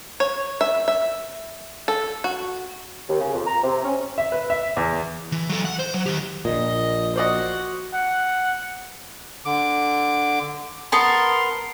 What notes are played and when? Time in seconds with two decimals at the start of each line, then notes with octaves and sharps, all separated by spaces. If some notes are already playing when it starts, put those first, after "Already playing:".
0.20 C#5
0.61 E5
0.88 E5
1.88 A4
2.24 F#4
3.09 D#2
3.20 C#3
3.32 F2
3.47 A#5
3.63 C3
3.84 C#4
4.18 E5
4.32 B4
4.50 E5
4.77 E2
5.32 E3
5.49 F#3 A4
5.65 F#5
5.79 C5
5.94 F#3
6.06 D#3 G4
6.45 A#1 A#2 D#5
7.16 F#4 C5 D5 D#5 F#5
7.94 F#5
9.45 D3 D6
10.92 B3 A#4 A5 C6